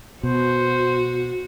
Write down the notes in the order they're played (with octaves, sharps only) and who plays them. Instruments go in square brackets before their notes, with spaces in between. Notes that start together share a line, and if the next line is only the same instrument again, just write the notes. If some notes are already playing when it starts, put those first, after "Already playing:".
[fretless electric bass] B2 [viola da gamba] F#4 [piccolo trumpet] C5